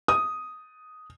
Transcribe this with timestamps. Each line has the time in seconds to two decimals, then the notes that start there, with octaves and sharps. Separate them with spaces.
0.08 D#6